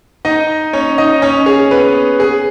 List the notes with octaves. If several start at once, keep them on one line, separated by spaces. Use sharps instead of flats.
D#4 D#5
C#4 C#5
D#4 D#5
C#4 C#5
G#4
B3 B4
G#4